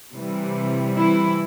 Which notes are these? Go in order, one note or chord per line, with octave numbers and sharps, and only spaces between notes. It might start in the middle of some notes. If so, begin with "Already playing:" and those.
C3 E3 G3
E3 E4